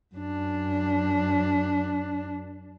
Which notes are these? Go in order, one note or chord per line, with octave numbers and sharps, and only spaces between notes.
F#2 D4